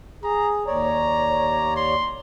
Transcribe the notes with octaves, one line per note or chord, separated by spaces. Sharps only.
G#4 A#5
D#2 C#5 D5 A#5
C6